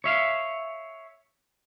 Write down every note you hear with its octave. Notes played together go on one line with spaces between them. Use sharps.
C#5 E5 F5